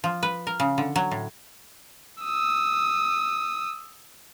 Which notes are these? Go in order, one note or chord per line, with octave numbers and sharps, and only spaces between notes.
F3
B4
A#4
C#3
D3
F#3
A2
D#6 E6